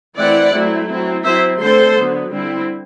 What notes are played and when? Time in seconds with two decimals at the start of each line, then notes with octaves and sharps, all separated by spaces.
0.17 E3 A3 C4 E4 D5 F#5
0.53 F#3 A3 C4 E4
0.88 F#3 C4 E4
1.24 F#3 C4 E4 C5 E5
1.59 D3 A3 C4 A4 C5
1.95 D3 F#3 B3
2.30 D3 G3 C4 E4